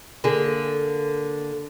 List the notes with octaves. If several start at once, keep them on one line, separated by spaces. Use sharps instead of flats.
D3 A#3 G#4